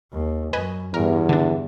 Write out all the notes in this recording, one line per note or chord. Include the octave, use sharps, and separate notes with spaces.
D#2
F#2 B4 D#5 G#5
E2 G2 A#4
D3 D4